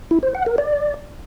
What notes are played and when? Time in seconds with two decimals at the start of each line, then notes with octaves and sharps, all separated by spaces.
0.11 E4
0.23 C5
0.35 F#5
0.46 A#4
0.58 D5